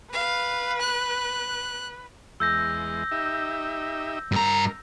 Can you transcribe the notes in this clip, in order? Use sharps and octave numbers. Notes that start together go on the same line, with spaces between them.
B4 F5
F#6
E2 G#3 E6 G6 A#6
D#4 G4 E5
G2 A#4 A#5